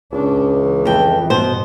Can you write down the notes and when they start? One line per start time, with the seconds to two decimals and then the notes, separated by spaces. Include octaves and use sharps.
0.12 C#2 C#4 D4
0.54 E3
0.85 F2 G5
1.30 G2 B2 C5